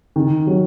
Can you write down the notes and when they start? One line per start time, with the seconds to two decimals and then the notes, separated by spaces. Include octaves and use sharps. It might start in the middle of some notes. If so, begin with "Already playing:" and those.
0.16 D#3
0.47 F#3